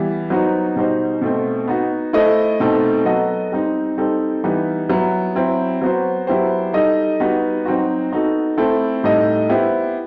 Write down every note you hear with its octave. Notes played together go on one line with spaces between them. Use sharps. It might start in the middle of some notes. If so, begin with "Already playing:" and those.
Already playing: E3 G3 B3 E4
F#3 B3 D#4 F#4 C5
B2 G3 D#4 F#4 C5
B2 A3 C4
B3 D#4 F#4
A3 E4 A4 C5 D#5
B2 A3 C4 D#4 A4
F#3 B3 F#4 A4 D#5
G3 C4 D#4
G3 C4 D#4 A4
E3 G3 B3 D#4
F#3 B3 E4
F#3 C4 E4
F#3 B3 F#4 C5
F#3 B3 E4 G4 C5
G3 D#4 A4 D#5
G3 B3 D#4 F#4 B4
F#3 C4 D#4 F#4
B3 D#4 F#4 A4
A3 C4 E4 A4
A2 G3 D#4 A4 D#5
B3 E4 G4 C5